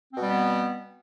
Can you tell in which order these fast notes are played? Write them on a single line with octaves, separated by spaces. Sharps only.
C4 B2 G3 B3